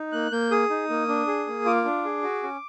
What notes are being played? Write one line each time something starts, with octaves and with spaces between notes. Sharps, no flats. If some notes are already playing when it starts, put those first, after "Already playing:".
Already playing: D#4
A#3 F#6
A#3 G6
G#4 D#6
D#4
A#3
D4
G#4
A#3
F4 D6
D4
G#4
F#4
C#4